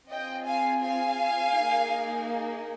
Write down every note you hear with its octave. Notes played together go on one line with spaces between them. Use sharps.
C4 F4 G#4 D#5 G5
F5 G#5
F5 G#5
A#3 D#4 G#4